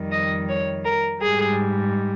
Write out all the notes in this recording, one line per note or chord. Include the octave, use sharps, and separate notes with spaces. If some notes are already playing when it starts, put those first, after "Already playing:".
Already playing: F2 D#3 G3
D#5
C#5
A#4
G#2 G3 G#4